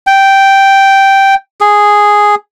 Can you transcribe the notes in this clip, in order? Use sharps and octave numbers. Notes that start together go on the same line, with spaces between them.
G5
G#4